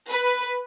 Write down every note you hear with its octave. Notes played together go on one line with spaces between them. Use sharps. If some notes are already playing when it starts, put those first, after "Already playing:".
B4